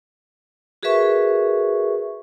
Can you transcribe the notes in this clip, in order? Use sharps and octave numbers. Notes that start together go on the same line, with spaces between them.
F#4 G#4 A#4 B4 E5 C#6